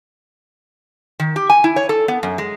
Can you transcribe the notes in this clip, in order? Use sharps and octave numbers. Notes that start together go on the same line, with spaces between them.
D#3
G4
G#5
E4
C#5
A4
B3
F#2
G#3